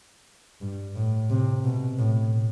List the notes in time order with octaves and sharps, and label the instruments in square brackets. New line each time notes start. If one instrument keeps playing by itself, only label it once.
[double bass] G2
A2
C3
B2
A2